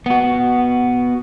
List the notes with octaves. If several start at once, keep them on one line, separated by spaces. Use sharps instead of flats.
B3 F#4